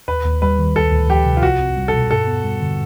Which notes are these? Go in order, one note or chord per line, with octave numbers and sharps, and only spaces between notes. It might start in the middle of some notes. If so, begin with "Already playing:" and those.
D#2 B4
D#2
G3 B4
D#3
D2 A4
D2
F3 G4
C3
F4
C2 F#4
C4
G3
A4
B2
G2 A4
B3
G3
D3